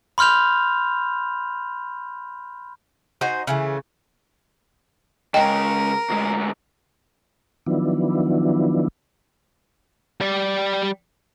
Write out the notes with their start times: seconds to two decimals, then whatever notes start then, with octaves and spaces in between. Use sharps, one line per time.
0.18 B5 C6 F6 G6 F7
3.21 D#4 F#4 C5 G#5
3.47 C#3 E3 A3
5.34 C#3 G#3 A#4 D#5 G5
6.10 D2 G#3
7.66 D#3 F3 F#3 B3 D4 E4
10.21 G3 D5